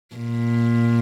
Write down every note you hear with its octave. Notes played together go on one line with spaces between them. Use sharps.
A#2